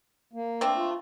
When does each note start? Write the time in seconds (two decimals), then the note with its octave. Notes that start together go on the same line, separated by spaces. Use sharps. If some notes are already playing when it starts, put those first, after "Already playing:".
0.33 A#3
0.61 A3 C4 D4
0.77 F4